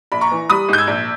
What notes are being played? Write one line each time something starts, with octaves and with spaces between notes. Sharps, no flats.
A#1 B5
A#5 C#6
E3
G3 B5 D#6
G#2 G6
E6 G#6
A#1